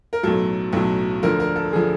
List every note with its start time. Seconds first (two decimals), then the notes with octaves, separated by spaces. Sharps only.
0.13 A#4
0.23 B1 A2 F#3 A4
0.73 B1 A2 F#3 A4
1.23 D2 D3 F3 A#4
1.40 A#4
1.56 A4
1.73 D3 F3 G#4